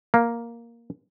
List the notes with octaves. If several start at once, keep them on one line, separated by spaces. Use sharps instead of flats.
A#3